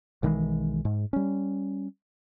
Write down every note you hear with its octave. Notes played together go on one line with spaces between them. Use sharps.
B1 D#3 E3 G#3
G#2
G3 C#4